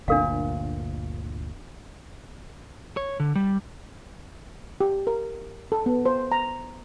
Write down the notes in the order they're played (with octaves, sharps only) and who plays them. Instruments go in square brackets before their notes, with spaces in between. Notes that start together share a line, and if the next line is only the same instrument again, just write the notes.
[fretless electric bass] G1 D2 A#2 [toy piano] D4 A#4 F5
[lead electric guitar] C#5
D3
G3
[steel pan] G4
A#4
A4
B3
C5
A#5